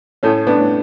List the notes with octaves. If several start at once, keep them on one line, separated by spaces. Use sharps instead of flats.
A2 A3 C#4
B3 D4
A2